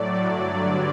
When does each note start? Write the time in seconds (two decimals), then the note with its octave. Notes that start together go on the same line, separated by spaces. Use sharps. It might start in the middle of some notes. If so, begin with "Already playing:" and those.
Already playing: A2 F#3 A3 D5
0.25 G2 D3 F#3